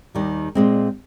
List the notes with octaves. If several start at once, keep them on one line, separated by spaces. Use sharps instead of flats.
D#2 D#3 G3
A#2 G#3 C4